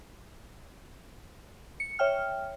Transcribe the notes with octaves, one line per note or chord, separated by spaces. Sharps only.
C#7
C#5 E5 G5 F6